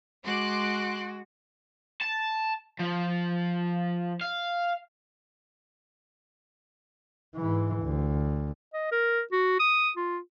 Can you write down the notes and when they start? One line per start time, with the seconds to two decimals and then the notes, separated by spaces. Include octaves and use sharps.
0.24 G#3 F#4 C6 D6 F#6
2.02 A5
2.80 F3
4.21 F5
7.36 G#2 E3
7.83 D2
8.73 D#5
8.92 A#4
9.32 F#4
9.60 D#6
9.96 F4